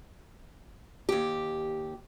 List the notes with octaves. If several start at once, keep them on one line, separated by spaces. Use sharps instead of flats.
D#2 G4